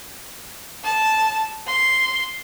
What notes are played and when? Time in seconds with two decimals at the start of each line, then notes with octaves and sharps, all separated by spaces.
0.84 A5
1.67 C6